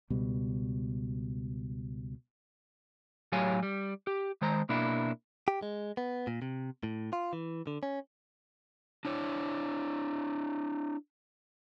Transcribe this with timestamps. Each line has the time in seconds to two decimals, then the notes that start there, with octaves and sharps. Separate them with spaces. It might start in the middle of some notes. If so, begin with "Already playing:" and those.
0.10 C#2 B2 G3
3.32 A2 F#3 G4 C#5 F5 G#5
3.63 G3
4.07 G4
4.41 D#3 G#3 C5 A#5
4.69 B2 A#3 D4 E4
5.48 G4
5.63 G#3
5.97 B3
6.27 A#2
6.42 C3
6.83 A2
7.13 F4
7.33 E3
7.67 D3
7.83 C#4
9.05 D4 E4 C#5